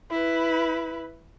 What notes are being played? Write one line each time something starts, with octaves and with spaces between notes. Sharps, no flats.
E4 B4